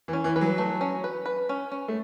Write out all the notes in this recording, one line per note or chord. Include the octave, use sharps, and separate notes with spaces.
E3
C#4
E3
E3 B4
F#3
A3
C#4
B4
B4
C#4
C#4
A3